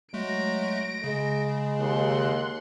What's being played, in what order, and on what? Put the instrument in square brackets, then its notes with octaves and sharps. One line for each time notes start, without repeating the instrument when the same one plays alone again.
[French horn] F#3 [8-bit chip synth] G#3 A3 [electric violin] A#6 D7
[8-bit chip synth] C#3 [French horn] G#3
[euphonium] D#2 [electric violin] F#5 C6